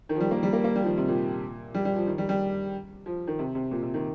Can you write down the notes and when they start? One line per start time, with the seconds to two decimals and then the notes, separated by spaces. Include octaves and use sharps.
0.09 D#3
0.15 F3
0.20 G3
0.31 A#3
0.43 G3
0.53 A#3
0.64 A#3
0.76 G3
0.82 F3
0.86 D#3
0.97 C3
1.08 A#2
1.75 G3
1.85 G3
1.96 F3
2.07 D#3
2.18 G3
2.29 G3
3.06 F3
3.27 D#3
3.39 C3
3.55 C3
3.71 A#2
3.83 C3
3.94 D#3